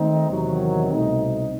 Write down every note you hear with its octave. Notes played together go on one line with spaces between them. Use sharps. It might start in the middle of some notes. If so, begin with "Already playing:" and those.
Already playing: D#3 A3 C4 D#4
E2 C3 D#3 F#3
C2 B2 A3 C4 D#4